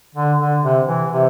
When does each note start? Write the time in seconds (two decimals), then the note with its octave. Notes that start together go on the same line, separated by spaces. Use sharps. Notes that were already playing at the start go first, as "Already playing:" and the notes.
0.15 D3
0.40 D3
0.63 C3
0.86 E3
1.11 C3